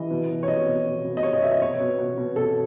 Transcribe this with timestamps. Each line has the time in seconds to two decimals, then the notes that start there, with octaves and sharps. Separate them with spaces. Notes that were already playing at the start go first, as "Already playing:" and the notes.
Already playing: E3 D#5
0.11 B2
0.30 B2
0.43 C#5
0.48 B2 D#5
0.67 B2
0.86 B2
1.04 B2
1.17 D#5
1.23 B2 C#5
1.33 D#5
1.42 B2 E5
1.51 D#5
1.62 B2 C#5
1.80 B2
1.99 B2
2.18 B2
2.36 B2 A4